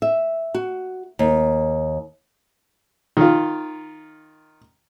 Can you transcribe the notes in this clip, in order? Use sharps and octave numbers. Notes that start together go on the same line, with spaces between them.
E5
F#4
D#2
D#3 F4